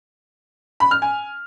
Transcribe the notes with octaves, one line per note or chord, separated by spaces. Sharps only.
B5
F6
G#5